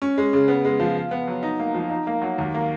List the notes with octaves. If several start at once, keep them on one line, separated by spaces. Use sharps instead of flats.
C#4
G#3
C#3
B3
G#3
F3
F4
B3
F#3
D#4
A#3
F3
D#4
A#3
F#3
D#2
A#3